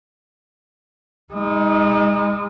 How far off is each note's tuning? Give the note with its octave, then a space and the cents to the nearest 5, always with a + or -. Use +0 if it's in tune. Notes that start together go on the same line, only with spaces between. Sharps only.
G#3 -35 D#4 +20